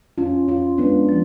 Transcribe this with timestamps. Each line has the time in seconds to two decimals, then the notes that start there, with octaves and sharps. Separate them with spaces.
0.18 F2 C#4 F4
0.48 F2 C#4 F4
0.78 G#3 B3 D4
1.09 F3